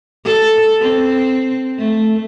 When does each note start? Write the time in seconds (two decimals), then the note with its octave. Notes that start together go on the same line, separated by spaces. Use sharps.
0.25 A4
0.80 C4
1.78 A3